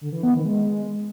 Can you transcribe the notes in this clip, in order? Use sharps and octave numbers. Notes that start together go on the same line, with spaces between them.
D3
E3
B3
D#3
G#3